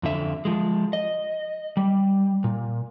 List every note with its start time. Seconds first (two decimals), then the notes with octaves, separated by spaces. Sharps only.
0.03 F2 D3 E5
0.45 F3 G#3
0.93 D#5
1.77 G3
2.44 A#2